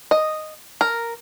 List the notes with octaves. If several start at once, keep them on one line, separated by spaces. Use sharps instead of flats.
D#5
A#4